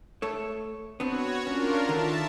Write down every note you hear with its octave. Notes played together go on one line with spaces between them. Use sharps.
A3 A4 C#5
B3 C4 D4 F#4 C#5
C#4 D4 F4 A#4
D3 D#3 E5 A5